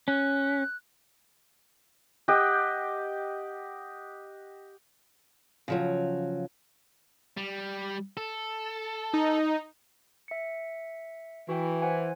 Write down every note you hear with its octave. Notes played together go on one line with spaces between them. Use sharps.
C#4 F#6
G4 D#5 F#5 G5
C#3 F3 F#3
G3
A4
D#4
E5 C#7
E3 F#4 G5
C5 F#5 G#5